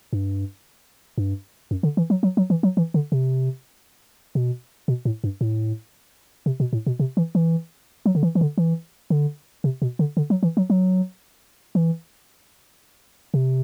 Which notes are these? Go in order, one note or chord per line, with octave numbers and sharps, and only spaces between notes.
G2
G2
F#2
D3
E3
F#3
F#3
F#3
E3
F#3
E3
D3
C3
B2
B2
A2
G2
A2
C3
B2
A2
B2
C3
E3
E3
F#3
D3
E3
E3
D3
E3
D3
C3
B2
D3
D3
F#3
E3
F#3
F#3
E3
C3